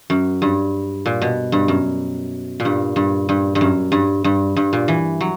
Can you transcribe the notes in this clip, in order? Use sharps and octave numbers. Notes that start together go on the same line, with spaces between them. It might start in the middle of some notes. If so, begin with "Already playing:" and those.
F#2
G2
A#2
B2
G2
F#2
A#2
G2
G2
G2
G2
F#2
G2
G2
G2
A#2
E3
F#3